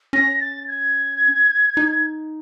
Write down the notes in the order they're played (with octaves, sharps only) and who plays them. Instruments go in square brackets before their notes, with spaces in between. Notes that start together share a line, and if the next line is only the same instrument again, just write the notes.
[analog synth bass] C#4 [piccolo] A#6
[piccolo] A6
G#6
[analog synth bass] D#4